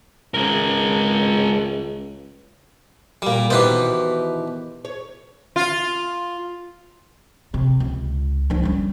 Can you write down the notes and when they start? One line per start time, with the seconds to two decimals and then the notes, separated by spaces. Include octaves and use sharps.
0.34 C#2 G#3 A#4
3.22 A#2 G3
3.50 B2 D#3 E3 G4 B4 C5
4.85 C#5
5.56 F4
7.54 C3
7.80 C#2
8.50 F3 D4
8.63 G3 C#4